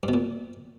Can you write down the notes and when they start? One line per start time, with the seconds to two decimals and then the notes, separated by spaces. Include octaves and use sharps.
0.03 G2
0.08 B2
0.13 A#2